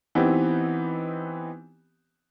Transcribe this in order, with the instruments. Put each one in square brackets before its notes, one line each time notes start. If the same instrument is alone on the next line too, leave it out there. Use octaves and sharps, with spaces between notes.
[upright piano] E3 B3 C4 D#4 G4